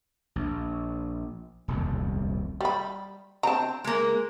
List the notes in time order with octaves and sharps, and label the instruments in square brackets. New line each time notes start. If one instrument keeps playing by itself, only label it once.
[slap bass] A#1
D#1 C2 F2
[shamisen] G3 B5
[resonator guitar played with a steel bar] C4 [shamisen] A5 A#5
[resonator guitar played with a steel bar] G#3 A#3